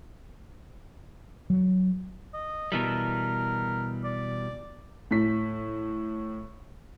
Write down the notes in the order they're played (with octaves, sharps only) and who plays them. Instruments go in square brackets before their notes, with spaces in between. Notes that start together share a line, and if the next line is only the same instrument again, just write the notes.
[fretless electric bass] F#3
[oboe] D#5
[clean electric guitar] B2 E3 G3 [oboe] A#4
[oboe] D5
[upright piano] A2 B6